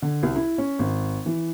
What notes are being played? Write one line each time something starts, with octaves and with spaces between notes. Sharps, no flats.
D3
C2
E4
C#4
G#1
E3